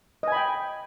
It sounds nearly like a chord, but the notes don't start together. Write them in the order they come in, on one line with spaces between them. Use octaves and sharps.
D#5 G#5 B5 G5